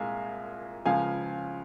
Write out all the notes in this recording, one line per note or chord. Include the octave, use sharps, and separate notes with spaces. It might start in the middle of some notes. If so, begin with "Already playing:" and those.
Already playing: C2 A#2 G#3 F5 G#5
C#2 C#3 F3 F5 G#5